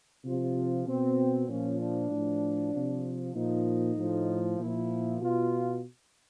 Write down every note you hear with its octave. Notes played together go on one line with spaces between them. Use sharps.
C3 F3 F4
B2 C4
A#2 F3 C#4
D4
A2
F3
C3 F3
A#2 F3 D#4
A2 F3
A#2 F3 E4
B2 F4